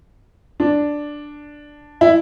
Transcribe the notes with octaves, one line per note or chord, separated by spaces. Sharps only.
D4
E4